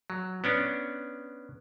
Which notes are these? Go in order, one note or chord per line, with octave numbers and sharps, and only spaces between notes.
F#3
B3 C#4 D4